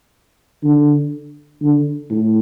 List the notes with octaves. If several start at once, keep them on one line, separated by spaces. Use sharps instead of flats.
D3
D3
A2